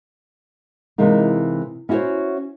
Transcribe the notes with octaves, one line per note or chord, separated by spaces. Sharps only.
C3 E3 G#3 A#3 D#4
C#4 E4 F#4 A4 C5 C#5